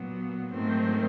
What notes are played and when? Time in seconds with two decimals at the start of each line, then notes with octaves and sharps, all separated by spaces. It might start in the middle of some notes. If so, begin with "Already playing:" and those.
Already playing: A#2 F#3 B3
0.52 G#2 D#3 F#3 A3 C4